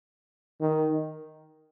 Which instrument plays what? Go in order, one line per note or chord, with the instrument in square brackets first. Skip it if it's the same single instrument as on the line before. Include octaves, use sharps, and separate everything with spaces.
[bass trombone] D#3